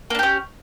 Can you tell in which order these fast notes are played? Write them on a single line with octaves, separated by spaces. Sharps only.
A#3 D4 G4 C#4